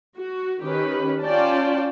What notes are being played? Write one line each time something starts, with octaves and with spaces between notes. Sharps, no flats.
F#4
D#3 C#4 G4 B4
C#4 F4 D5 G5 A5